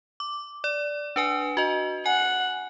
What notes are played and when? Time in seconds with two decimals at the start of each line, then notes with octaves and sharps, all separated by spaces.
0.20 D6
0.64 D5
1.16 D4 B4 G#5
1.57 F#4 D#5
2.06 F#5 G#5